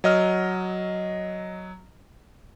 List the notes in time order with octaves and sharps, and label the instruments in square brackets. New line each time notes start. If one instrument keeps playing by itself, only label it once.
[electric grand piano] F#3 D#5 F6